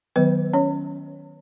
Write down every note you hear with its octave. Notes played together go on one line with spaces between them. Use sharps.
D#3 F#3 B3 B4
C#4 C#5